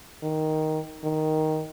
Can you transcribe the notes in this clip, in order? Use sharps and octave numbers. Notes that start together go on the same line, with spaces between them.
D#3
D#3